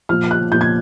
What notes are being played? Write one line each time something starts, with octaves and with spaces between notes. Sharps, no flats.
A#2 F3 F6
F#6
A#2 F3 G6
G#6